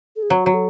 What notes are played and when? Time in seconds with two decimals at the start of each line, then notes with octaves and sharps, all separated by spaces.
0.16 A4
0.23 G#4
0.30 F#3 F#4
0.46 F#3
0.54 A4